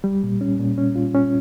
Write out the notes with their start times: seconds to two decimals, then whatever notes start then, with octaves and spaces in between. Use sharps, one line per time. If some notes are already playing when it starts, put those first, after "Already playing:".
0.04 G3
0.23 A#2
0.41 C#4
0.59 A#2
0.78 C#4
0.96 F4
1.15 C#4